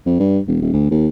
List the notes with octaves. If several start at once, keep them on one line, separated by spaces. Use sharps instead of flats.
F2
G2
E1
D#1
D2
D#2